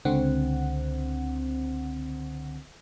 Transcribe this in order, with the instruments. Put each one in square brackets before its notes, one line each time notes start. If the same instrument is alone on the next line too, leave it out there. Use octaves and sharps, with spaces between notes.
[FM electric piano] C#2 D3 C4 F#5